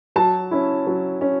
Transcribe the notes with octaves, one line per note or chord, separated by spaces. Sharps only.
F#3 A5
C#4 E4
F#3
C#4